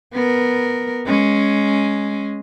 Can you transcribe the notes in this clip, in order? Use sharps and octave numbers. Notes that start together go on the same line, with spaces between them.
B3 A#4
G#3 C#4